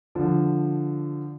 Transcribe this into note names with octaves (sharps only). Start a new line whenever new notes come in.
D3 F3